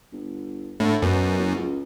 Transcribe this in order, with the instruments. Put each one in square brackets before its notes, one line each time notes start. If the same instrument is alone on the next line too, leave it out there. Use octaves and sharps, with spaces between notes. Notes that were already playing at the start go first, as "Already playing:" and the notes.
[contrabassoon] G1
[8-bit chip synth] A2 [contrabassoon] D3
[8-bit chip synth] F#2 [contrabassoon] B2
[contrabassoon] F#1
C#2